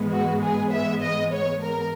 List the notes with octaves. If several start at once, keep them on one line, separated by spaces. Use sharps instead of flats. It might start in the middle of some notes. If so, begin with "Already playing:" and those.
Already playing: G#2 E3 G#3 B3
F#4
G#4
E5
D#5
C#5
A#4